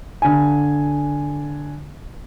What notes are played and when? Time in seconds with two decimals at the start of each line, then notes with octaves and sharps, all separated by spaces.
0.22 D3 G#5